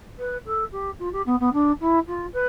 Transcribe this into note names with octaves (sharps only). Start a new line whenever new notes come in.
B4
A4
G4
F4
G4
B3
B3
D4
E4
F4
B4